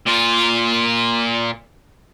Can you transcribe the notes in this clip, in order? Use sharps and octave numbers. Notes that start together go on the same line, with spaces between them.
A#2 F4